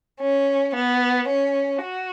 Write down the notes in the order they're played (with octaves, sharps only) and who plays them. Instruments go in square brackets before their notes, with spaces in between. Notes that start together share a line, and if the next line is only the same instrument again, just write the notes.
[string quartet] C#4
B3
C#4
F#4